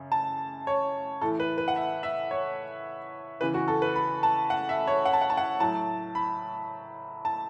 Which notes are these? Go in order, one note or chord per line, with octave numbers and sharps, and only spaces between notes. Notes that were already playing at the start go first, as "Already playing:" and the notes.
Already playing: F#2 C#3
A5
C#5
A2 E3 A4
B4
B4
F#5
E5
E5
C#5
E2 C#3 E3 B4
F#4
A4
B4
B5
A5
F#5
E5
C#5
F#5
A5
F#5
A5
F#5
A2 F#3 A5
B5
A5